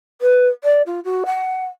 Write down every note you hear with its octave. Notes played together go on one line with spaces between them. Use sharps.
B4
D5
F4
F#4
F#5